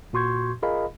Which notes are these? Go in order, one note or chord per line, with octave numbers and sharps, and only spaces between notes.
A#2 F#4 C6 C#6 G6 G#6
F4 G#4 A#4 D#5 F5 B5